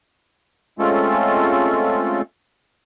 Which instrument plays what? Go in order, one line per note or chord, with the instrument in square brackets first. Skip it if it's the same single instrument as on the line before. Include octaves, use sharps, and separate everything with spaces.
[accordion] G#3 A3 C4 C#4 F4 A4